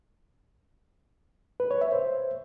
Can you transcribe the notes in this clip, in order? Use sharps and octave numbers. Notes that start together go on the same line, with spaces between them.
B4
C#5
E5
C5